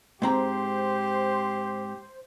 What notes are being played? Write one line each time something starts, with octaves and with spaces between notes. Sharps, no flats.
G#2 C4 G4 C5 A#5